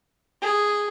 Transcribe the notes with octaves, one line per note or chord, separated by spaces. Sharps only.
G#4